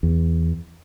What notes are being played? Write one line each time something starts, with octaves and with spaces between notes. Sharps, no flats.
E2